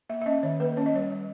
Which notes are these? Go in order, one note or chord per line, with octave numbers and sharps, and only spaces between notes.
A#3 E5
E5
C#4 D#5
D#3 C#5
A#3 B4
C#4 C#5
D#5
G3 C#5
G3